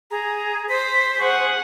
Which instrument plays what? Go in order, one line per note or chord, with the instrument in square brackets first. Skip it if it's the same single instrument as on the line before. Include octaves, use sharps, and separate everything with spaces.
[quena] G#4 [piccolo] A#5
[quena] C5 [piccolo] B6
[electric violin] G#4 F#5 [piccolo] C#6